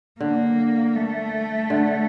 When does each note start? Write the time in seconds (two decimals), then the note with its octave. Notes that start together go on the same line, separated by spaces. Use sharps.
0.20 D3 A#3
0.96 A3
1.70 D3